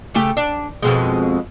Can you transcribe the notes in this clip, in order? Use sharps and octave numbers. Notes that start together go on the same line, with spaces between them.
C#3 A3 G4
D4
F2 B2 G#3